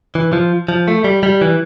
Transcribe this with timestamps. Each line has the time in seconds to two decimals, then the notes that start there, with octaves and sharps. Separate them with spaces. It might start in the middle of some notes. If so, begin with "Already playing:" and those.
0.15 E3
0.33 F3
0.68 F3
0.88 A3
1.04 G3
1.23 G3
1.41 E3